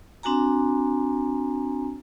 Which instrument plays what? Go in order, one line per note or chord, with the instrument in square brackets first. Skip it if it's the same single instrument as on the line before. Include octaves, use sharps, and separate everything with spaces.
[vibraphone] C4 D4 F#4 G#5 A#5